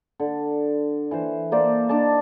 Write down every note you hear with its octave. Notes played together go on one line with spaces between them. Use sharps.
D3
E3 C5
A#3 C5 D5 A5
D4 D#4 D5 A5